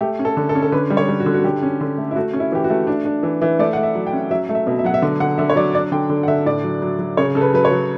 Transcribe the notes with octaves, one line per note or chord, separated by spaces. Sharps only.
A3 G4
C#4
A4
D3
A4
C#4
A4
D3 B4
G3
C#5
G3
F#4
D3
F#4
D3 G4
C#4
D3
A3
E4
A3 F#4
C#4
E4
E3 G4
F#4
A3
D4
D4
E3
E3
A3 D5
A3 F#5
E5
F#3
G5
C#4
F#3 E5
A3
E5
B2
E5
F#3 F#5
E5
D3
D3 F#5
D3 E5
C#5
F#3 D5
D4 D5
D3 G5
D3
F#5
D3 E5
A2 D5
F#3
F#3
F#3
C#3 C#5
C#3 A4
B4
F#3 B4
C#5
F#3